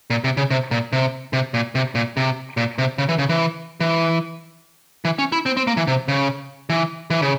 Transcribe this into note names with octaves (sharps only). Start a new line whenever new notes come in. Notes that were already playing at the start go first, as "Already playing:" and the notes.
A#2
C3
C#3
C3
A#2
C3
C3
A#2
C3
A#2
C3
A#2
C3
C#3
E3
C#3
E3
E3
E3
C#4
E4
C4
C4
A#3
E3
C3
C#3
E3
E3
C#3